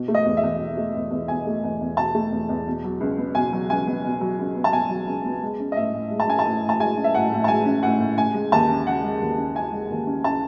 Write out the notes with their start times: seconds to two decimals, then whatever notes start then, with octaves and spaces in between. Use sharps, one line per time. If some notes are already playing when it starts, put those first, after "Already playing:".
Already playing: B2
0.08 A3
0.14 D#5
0.25 E2
0.37 E5
0.43 E2
0.60 B2
0.77 A3
0.95 E2
1.11 E2
1.28 B2 G#5
1.46 A3
1.64 E2
1.81 E2
1.97 B2 A5
2.14 A3
2.32 E2
2.49 E2
2.67 B2
2.84 F#3
3.00 C#2
3.18 B3
3.35 B2 G#5
3.53 F#3
3.70 C#2 G#5
3.87 B3
4.04 B2
4.21 F#3
4.39 C#2
4.57 B3
4.64 A5
4.73 B2 G#5
4.90 F#3
5.07 C#2
5.25 B3
5.43 G#3
5.60 C#4
5.72 D#5
5.76 A2 E5
5.93 A2
6.11 G#3
6.20 A5
6.28 C#4 G#5
6.39 A5
6.45 A2
6.62 A2
6.69 A5
6.79 G#3 G#5
6.97 C#4
7.04 E5
7.14 A2 F#5
7.32 A2
7.44 A5
7.48 G#3 G#5
7.65 C#4
7.83 A2 F#5
8.00 A2
8.17 C#3 G#5
8.34 G#3
8.52 D#2 A5
8.70 C#4
8.87 C#3 F#5
9.03 G#3
9.21 D#2
9.38 C#4
9.55 C#3 G#5
9.72 G#3
9.90 D#2
10.07 C#4
10.24 C#3 A5